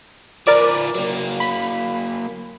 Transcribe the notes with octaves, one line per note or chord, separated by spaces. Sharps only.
F3 A#4 B4 D5 D6
F#3 A#3
B5